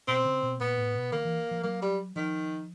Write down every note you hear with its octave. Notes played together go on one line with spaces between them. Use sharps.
B2 C4
C#3
B2
A#2 B3
A2
B2
D#3 A#3
E3
F3
F#3 A#3
G3
D#3 F3